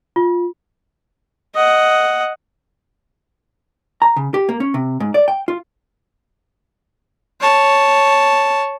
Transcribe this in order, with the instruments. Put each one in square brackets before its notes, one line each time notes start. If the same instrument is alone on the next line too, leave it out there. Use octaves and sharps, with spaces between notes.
[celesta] F4
[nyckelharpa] D#5 F#5
[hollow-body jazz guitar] A#5
C#3
G4
A#3
C#4
C3
G#2
D5
G5
F4
[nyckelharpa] C#5 A5